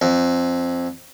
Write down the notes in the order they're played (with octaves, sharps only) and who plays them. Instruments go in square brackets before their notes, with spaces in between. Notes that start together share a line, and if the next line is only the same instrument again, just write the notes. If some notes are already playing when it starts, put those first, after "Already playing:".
[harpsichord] F2